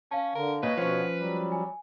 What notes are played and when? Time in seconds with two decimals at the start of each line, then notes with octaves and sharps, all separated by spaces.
0.11 C#4 F5 A5
0.35 D3 A#4
0.63 A#2 B4 C#5 D#5
0.77 B2 F3 C#4 C#5 F#5
1.17 F#3 G3
1.52 G#5